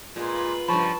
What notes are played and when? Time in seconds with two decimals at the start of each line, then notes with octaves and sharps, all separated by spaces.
0.16 A#2 G#3 F4 B4
0.68 G2 C#3 F3 A5 B5 C#6